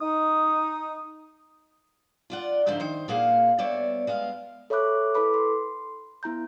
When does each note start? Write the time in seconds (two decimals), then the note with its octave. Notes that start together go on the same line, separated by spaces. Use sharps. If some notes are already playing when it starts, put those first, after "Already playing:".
0.02 D#4 D#6
2.30 F4 D5 F#5
2.66 G#2 D3 F3 E4 C5 A#5
2.80 D#3 C5
3.08 A#2 A#3 G#4 F5 F#5
3.58 G3 B3 C#5 D5 E5
4.07 G#3 B3 F5
4.70 A4 C#5 E5 B5 D6 F#6
5.15 E4 A4 B4 B5 D6
5.34 C6
6.23 B3 E4 A#5 G6